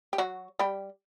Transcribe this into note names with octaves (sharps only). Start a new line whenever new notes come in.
G4
F#3 F#4
G3 G4